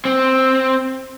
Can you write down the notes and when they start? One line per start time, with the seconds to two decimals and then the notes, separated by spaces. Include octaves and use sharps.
0.05 C4